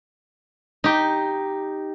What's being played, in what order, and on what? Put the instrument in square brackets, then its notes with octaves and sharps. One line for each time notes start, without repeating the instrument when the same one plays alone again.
[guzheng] D#4 G4